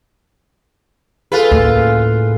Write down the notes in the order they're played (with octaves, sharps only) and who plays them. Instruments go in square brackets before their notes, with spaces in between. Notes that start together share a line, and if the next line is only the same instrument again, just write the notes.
[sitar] F4 B4 [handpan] G#4 A4
[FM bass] D2 [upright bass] A2 [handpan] C#3 A#3